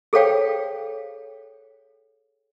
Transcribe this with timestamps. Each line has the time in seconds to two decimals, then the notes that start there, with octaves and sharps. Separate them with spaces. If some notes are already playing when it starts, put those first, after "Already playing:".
0.13 G#4 A4 C5 C#5 F5 G5